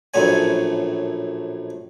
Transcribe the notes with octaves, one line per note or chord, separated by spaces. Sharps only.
A#1 F#2 A2 C#5 G#5